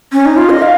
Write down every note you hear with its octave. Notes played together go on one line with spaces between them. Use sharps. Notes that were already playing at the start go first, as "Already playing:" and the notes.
C#4
D#4
F4
D#5
F5